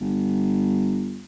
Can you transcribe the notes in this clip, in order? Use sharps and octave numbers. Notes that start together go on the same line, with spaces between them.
G1